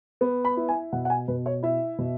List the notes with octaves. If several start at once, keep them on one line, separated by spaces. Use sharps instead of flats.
B3
B5
E4
G#5
B2 F#5
F#5
G#5
B2 B4
C#5
E4 E5
B2